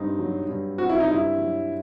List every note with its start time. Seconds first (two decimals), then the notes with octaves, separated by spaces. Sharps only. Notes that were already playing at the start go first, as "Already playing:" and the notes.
Already playing: G2 C4 D#4
0.19 F#3
0.49 G2
0.78 C4 F#4
0.89 E4
1.00 D#4
1.08 G2 E4
1.38 F#3